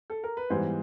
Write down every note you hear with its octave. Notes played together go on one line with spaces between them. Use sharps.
A4
A#4
B4
G#2 E3 G3 B3 C5